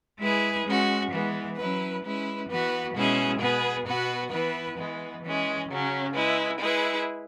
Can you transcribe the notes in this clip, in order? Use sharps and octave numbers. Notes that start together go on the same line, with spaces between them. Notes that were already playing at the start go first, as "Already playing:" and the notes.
G#3 E4 G#4 B4
G#3 C#4 F#4
E3 G#3 B3
F#3 C#4 E4 B4
G#3 C#4 E4 B4
E3 B3 F#4 B4
B2 G#3 C#4 E4 G#4
B2 B3 G#4 B4
B2 B3 F#4 B4
E3 B3 E4 B4
E3 G#3 B3
E3 G#3 C#4
C#3 F#3 C#4
G#3 E4 B4
G#3 E4 G#4 B4